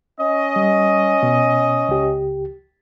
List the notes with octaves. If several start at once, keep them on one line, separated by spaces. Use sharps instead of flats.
C#4 D#5
G3
B2
C#2 G4